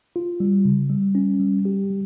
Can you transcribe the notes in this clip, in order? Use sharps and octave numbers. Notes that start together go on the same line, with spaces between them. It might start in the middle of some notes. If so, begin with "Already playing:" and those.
F4
G3
C#3
G3
C#4
G3
G4
G3